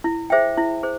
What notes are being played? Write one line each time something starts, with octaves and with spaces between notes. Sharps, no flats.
E4
G#4 C5 E5 G5
E4
G#4 C5